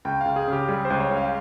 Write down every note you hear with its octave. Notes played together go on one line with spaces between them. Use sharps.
C#2 G5
C#2 F5
G#4
C#3 G4
G3 G#4
C5
C#2
C#5
C#2
F5